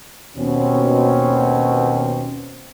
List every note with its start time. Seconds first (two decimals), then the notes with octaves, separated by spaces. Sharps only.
0.36 D#2 B2 C4 C#4